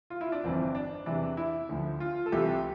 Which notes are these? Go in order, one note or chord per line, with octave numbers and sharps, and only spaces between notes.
F4
E4
D4
G1 F2 E3 C4
D4
E2 C3 E3 D4
E4
D2 D3 F3
F4
A4
C2 C3 E3 G4